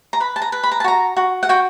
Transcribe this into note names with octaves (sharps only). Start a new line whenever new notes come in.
A#5
B4 B5
A5
A#5
B4
B5
A#5
A5
F#4 A#5
F#4
F#5
F#4 G5